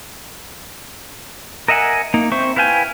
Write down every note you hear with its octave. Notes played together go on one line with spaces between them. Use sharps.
A#4 D#5 E5 F#5 G#5
A#3 D#4
C4 C5 E5 C#6
E4 B4 F5 G5 G#5